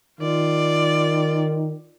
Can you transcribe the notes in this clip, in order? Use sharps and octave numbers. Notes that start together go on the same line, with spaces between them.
D#3 F4 D5